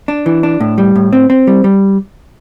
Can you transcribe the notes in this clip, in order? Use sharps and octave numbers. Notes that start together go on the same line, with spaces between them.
D4
E3
D4
A2
G3
A2
C4
C4
G3
G3